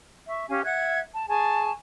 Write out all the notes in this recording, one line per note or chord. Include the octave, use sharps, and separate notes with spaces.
E5 C#6
C#4 G4 F5 G#5
E5 F#5 F#6 G#6
A5
G#4 G#5 A5 C#6